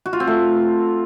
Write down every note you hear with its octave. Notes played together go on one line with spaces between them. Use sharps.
F#4
F4
C4
A3